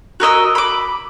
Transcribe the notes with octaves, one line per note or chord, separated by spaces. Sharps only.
F#4 A#4 D#5 E6
B5 D6